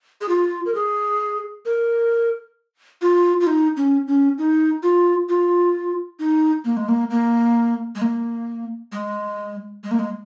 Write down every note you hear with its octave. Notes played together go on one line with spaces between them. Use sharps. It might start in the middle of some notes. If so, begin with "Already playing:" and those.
G#4
F4
A#4
G#4
A#4
F4
F4
D#4
C#4
C#4
D#4
F4
F4
D#4
A#3
G#3
A#3
A#3
G#3
A#3
G#3
G#3
A#3
G#3